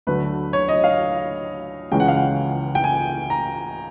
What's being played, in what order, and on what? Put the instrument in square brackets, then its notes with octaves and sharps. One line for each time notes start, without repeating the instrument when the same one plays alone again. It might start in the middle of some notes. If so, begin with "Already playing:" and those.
[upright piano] D2 D3 F#3 A3 B4
C#5
D#5
F5
C#2 C#3 E3 G#3 C#4 G5
F#5
F5
F#5
G5
G#5
A#5